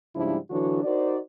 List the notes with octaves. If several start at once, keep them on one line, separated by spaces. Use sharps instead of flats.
G#2 C#3 F3 G3 D4 E4
D3 E3 F#3 D4 F#4 A4
D#4 F#4 A#4 C5 D5